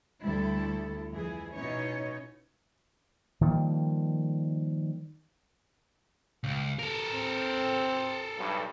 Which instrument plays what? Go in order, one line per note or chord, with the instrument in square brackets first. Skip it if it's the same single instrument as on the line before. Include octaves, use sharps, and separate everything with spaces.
[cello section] D2 G3 E4 A4
F2 E3 E4 G#4
B2 C#4 D#4 E4 C#5
[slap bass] D#3 F3 G3 A#3
[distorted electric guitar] C#2
A4 A#4
[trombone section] C4
B1 G2